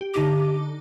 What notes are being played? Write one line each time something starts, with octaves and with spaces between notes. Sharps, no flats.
G4
D3 D#4 G4 D6